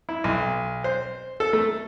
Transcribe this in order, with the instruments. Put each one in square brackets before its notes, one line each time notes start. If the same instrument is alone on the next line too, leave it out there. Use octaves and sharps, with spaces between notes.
[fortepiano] E4
B1
C5
A4
A3